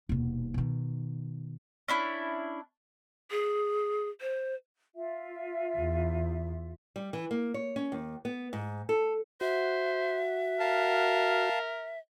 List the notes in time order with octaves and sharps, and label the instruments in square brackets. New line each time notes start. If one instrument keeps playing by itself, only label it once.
[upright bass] D#1 B2
B2 D#3
[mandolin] C#4 D4 E4
[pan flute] G#4
C5
[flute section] F4 E5
[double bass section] E2
[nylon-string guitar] G3
E3
A#3
C#5
C#4
D#2
B3
G#2
A4
[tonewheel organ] F#4 [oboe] C5 [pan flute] E5
[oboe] A#4 [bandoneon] F5 A5